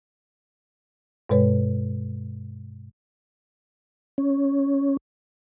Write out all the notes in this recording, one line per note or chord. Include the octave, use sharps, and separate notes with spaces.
G2 B2 G#3 B4 C#5
C#4